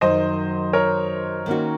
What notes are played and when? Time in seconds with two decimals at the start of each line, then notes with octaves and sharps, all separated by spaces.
0.01 F#2 D#3 F#3 C5 D#5
0.73 A#4 C#5
1.46 D#3 A#3 C#4 F#4